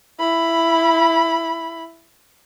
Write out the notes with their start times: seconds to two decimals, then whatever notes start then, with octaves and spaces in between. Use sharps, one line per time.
0.19 E4 B5